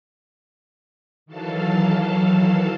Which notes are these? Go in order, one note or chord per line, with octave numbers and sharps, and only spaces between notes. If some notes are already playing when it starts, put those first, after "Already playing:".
D#3 E3 F#3 A4 F5 A5